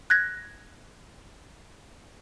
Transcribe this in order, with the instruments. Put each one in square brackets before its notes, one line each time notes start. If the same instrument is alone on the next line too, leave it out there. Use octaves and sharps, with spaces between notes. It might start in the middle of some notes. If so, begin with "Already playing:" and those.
[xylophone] F#6 G#6 A#6